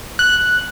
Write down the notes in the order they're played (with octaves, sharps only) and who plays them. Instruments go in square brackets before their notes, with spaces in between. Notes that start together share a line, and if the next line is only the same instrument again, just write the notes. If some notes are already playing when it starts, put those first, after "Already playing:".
[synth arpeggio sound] F#6